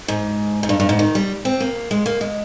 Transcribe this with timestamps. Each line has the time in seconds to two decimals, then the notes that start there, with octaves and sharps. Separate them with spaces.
0.08 G#2
0.63 G#2
0.69 G2
0.80 G2
0.89 G#2
0.99 D#3
1.15 G3
1.45 C4
1.60 A#3
1.91 G#3
2.06 A#3
2.21 G#3